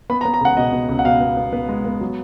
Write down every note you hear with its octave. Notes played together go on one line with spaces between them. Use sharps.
B3 B5
A#5
B3
A#5
C#2 F#5
B2 D#5
B2
C#2
F#5
B2 F5
B3
B3
B3
G#3
B3
F#3